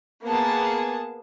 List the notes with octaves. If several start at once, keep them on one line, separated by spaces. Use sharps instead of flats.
A#3 B3 G#4 A5